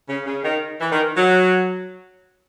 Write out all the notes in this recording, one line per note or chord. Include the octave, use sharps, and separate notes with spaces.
C#3
C#3
D#3
E3
D#3
F#3